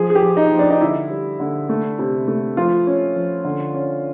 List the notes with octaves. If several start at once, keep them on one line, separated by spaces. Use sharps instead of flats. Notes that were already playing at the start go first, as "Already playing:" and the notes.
Already playing: F3 G#4
G#4
G4
F3
D#4
F3
D4
D#4
D3 E4
G3
D3
A3
C3
A3
F3 F4
C#4
F3
D3
C#4